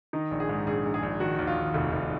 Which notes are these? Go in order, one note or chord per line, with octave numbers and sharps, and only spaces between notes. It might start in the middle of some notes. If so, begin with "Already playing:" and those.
D#3 D#4
A#1
G#4
G#2
A#1 G#4
A#1
G#4
A#1
D#3 F#4
D#2
F4
D#2
F1
F1